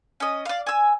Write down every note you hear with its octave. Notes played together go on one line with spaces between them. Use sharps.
C#4 D#5
D5 F5
G#5 E6